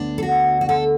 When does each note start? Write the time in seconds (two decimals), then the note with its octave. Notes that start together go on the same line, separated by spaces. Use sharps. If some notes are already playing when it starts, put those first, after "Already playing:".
Already playing: D2 D3 B3 D4
0.18 A4
0.23 F#4
0.61 F#4
0.69 A4